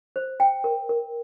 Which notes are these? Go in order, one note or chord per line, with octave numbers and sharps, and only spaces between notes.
C5
G5
A#4
A#4